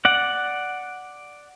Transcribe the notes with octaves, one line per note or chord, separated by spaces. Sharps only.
D5 F#5